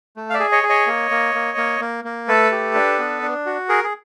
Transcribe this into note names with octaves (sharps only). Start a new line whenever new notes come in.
A3
F5
D5 E5
G#4
C#5 D#5
G#4
C#5 D#5
A#3
A#3
A#3
A#3
A#3
A#3
A3 A4 B4
G4
D4
B3
D4
F#4
G#4 A#4
G#4